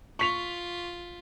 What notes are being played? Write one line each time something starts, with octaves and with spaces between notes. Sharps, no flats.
F4 C#6 B6 F7